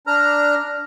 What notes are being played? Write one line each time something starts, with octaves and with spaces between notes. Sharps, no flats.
D4 A#5 F6